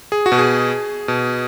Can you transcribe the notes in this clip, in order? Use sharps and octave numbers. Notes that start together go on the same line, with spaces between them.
G#4
F#4
B2
G#4
B2